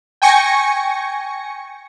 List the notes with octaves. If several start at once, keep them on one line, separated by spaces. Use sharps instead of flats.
G5 G#5 C#6 A#6 C#7